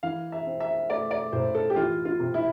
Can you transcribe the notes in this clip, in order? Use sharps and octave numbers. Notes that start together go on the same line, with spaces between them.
E3 F5
E5
C4
E5
A3 D5
D5
A2 C5
A4
G4
E3 F4
F4
C3
E4